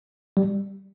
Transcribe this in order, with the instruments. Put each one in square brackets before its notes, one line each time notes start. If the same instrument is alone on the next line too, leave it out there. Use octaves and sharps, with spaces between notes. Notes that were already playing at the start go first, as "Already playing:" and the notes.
[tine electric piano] G3